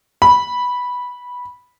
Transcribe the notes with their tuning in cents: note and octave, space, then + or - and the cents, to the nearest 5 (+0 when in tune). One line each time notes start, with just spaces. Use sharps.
B5 -10